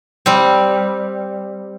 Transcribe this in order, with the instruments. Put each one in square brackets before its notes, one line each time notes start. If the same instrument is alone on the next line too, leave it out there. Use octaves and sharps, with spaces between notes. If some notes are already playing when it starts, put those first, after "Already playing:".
[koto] G3 C4